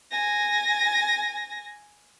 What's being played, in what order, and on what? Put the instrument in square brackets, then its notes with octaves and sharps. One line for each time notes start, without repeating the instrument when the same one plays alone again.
[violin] G#5 A#6